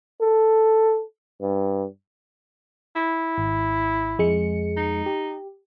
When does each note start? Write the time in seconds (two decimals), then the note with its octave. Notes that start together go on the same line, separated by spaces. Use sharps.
0.21 A4
1.41 G2
2.96 E4
3.38 G#1
4.19 F2 G#3 C#7
4.77 D#4
5.06 G4